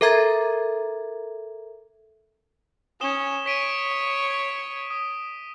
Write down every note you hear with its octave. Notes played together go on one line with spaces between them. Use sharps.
A4 A#4 E5 A#5 G#6 A6
C#4 D#6 E7 G7
C#5 B6 D7 D#7
D#6